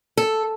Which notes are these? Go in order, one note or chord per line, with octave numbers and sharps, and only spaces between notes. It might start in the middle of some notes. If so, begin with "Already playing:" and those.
A4